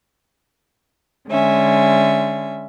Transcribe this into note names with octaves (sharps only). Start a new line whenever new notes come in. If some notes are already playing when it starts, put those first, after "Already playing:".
D3 G#3 C#4 E5